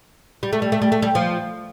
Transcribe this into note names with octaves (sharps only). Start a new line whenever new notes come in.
G3
A3
G3
A3
G3
A3
G3
F3